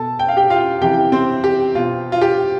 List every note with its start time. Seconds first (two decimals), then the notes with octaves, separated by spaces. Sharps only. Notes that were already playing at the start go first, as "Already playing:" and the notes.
Already playing: B2 A4 A5
0.19 G5
0.28 F5
0.37 G4 G5
0.50 F4 F5
0.82 C3 E3 G4 G5
1.12 C4 C5
1.44 G4
1.75 B2 F4
2.12 F4
2.21 G4